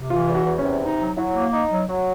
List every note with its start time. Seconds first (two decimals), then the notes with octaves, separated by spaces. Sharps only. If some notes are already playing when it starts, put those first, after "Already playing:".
Already playing: C3
0.10 E3 F4
0.29 E2
0.35 F#4
0.46 E2
0.58 C#4
0.64 C3
0.82 D#4
1.00 F#3
1.17 F#3 E4
1.34 A#3
1.53 D#4
1.71 F#3
1.88 F#3